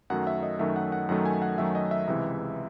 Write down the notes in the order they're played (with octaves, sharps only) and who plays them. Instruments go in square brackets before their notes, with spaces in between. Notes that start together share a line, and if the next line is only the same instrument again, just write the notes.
[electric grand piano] F#2 D#3 F#3 A3 F#5
E5
D#5
F#2 D#3 F#3 A3 E5
F#5
F#5
F#2 D#3 F#3 A3 F#5
G#5
F#5
F#2 D#3 F#3 A3 E5
D#5
E5
C#2 C3 E3 G#3 E5